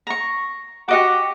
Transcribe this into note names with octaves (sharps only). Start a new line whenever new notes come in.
A#5 C#6
F#4 G4 D#5 D6